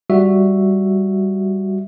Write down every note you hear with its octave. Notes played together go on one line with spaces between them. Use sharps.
G3 F#4 E5